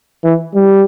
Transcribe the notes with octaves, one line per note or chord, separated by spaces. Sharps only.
E3
G3